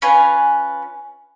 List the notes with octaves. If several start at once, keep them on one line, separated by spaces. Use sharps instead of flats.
C#4 F4 B4 G#5